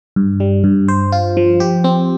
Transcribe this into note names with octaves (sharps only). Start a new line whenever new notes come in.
G2
G3
G2
C5
F4
F3
G4
C4